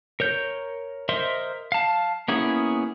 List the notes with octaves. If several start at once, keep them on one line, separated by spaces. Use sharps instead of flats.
A#4 C#5 G6
A#4 C5 D#5 E5 C6
F5 A5
A#3 B3 C#4 E4 G#4